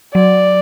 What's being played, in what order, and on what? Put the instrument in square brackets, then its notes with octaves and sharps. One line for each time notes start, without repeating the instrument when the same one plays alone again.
[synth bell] F#3 [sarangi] D5